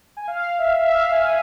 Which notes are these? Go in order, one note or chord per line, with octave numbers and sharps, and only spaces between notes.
G#5
F5
E5
E5
F5
G#5